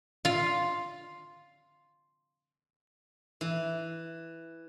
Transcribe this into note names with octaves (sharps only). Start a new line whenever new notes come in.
F4 F5
E3